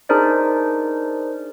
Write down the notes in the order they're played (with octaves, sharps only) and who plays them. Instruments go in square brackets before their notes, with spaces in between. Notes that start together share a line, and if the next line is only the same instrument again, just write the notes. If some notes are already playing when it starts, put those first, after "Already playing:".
[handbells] D4 D#4 G#4 A#4 C5 D5